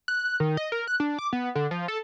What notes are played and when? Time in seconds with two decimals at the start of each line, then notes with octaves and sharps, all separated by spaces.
0.08 F#6
0.40 D#3
0.57 D#5
0.72 A#4
0.88 F#6
1.00 D4
1.19 D6
1.33 B3
1.55 D3
1.71 F3
1.88 A4